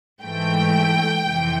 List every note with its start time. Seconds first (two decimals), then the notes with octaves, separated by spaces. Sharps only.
0.22 G#2 E3 A3 G5
1.23 F2 C3 E3